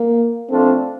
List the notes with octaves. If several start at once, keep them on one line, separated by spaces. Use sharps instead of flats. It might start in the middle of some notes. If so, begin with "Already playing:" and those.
Already playing: A#3
F3 A3 C4 D4 F4 A4